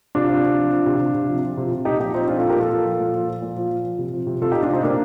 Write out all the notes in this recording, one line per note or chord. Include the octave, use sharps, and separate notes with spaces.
C3 D4 F4
C3
C3
F3
F3
C3
C3
C3
F3
F3
C3
C3
A#2 D#4 G4
F3 D#4 G4
F3 C4 D#4
A#2 D4 F4
F4 A4
F3
G4 A#4
A#2 F4 A4
F3
F3
A#2
F3
F3
A#2
F3
F3
F3
C3
F3
C3
C3 F4 A4
D#4 G4
C3
D4 F4
C3 C4 D#4
C3 A#3 D4